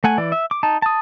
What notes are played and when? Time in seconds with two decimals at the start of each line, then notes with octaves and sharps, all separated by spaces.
0.04 A3 F#5 G#5
0.18 E3 D5
0.32 E5
0.51 D6
0.63 D#4 A5
0.82 A5 D#6